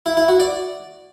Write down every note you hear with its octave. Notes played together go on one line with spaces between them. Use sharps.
E4
E4
F#4
D5